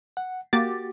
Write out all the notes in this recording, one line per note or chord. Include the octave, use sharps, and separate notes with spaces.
F#5
A#3 F#4 G4 D6 A6